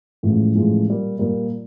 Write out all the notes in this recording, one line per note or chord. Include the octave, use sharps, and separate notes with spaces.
A1 A2 F3 G#3
A1 A2 F3 G#3
A#2 G3 A#3
A#2 G3 A#3